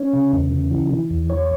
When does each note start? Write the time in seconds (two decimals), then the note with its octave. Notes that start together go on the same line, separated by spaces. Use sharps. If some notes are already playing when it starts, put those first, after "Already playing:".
Already playing: C#4
0.13 C#3
0.33 E2
0.52 C#3
0.71 E3
0.91 E3
1.10 E2
1.30 C#5